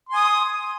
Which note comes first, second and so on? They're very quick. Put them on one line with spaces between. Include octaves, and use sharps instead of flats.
C6 G#5 D#6